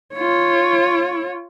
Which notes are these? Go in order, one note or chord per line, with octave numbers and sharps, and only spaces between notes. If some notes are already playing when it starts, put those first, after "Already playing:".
F4 C#5